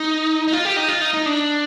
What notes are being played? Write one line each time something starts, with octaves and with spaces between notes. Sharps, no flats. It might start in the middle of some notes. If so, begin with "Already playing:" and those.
Already playing: D#4
D#4
F4
G4
D#4
F4
D#4
D#4
D4